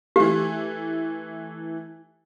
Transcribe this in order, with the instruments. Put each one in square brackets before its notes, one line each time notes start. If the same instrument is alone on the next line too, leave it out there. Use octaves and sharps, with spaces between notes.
[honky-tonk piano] E3 A3 [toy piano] G4